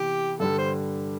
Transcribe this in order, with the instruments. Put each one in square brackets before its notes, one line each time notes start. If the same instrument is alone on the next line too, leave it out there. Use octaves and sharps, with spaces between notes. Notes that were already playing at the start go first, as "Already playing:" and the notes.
Already playing: [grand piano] C3 E3 B3 [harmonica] G4
[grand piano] G2 D3 G3 [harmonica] A4
[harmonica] C5